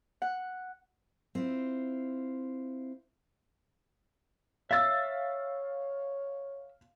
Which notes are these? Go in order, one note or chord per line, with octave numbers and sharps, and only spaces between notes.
F#5
C4 E4 F4
C#5 E5 F5 E6 A6